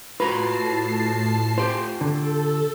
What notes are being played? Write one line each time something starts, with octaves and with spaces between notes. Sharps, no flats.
A2 F4 F#4 B4 A5 A#5 C7
F4 G4 C5
D3 A4